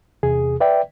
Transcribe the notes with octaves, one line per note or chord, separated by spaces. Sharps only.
E2 C3 G#4
B4 D5 E5 G5